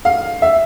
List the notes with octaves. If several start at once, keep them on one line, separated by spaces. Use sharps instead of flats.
F5
E5